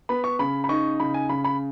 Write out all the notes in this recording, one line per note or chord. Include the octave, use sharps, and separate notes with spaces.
B3 B5
C#6
C#3 B5
B5
D#4 C#6
C#3 B5
G#5
C#3 B5
B5